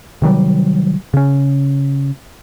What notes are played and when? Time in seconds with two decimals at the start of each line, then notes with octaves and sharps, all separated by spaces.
0.22 C3 D#3 F#3 G3
1.14 C#3 C#4